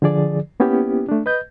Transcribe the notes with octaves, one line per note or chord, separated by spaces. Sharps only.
D3 F3 G#4 D5
A#3 B3 C#4 E4 G4
A3 D4
B4 D#5 G6